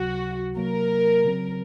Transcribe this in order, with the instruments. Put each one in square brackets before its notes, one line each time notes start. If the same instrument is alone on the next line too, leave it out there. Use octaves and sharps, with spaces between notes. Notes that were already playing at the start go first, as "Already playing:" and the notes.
Already playing: [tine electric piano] C#2 C3 F#3 [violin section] F#4
[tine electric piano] C3 F#3 A#3 [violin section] A#4
[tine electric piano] C#3 F#3 C4